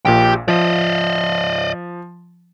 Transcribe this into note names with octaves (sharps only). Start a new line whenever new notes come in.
A#1 A#2 G4 G5
F3 D5 D#5